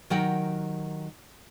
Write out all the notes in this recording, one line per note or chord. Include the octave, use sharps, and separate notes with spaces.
D#3 F#3 G4 A#4 F#5 G5